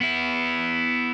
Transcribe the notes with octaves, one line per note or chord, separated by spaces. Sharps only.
B3 E4